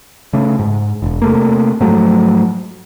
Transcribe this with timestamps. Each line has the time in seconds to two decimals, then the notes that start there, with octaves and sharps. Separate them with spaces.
0.33 C#3 A3
0.59 G#2
1.02 E1
1.22 C3 A3 A#3
1.80 G#2 F3 F#3 A3